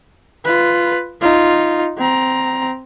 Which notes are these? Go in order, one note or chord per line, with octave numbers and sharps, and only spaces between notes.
F4 B4
D#4 F4
C4 A#5